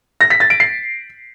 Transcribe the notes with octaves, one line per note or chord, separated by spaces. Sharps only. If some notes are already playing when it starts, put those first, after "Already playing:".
A#6
B6
A6
D7
C7